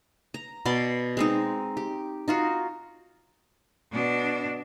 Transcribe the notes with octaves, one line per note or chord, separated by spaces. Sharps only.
A#5
B2 D5 C6
G#3 C4 D#4
G4
D#4 F4 F#4
B2 D4